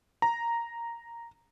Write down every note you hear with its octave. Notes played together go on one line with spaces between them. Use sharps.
A#5